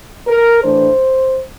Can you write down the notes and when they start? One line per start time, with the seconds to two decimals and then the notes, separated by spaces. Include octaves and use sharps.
0.27 A#4
0.63 A2 E3 A3 D4 C5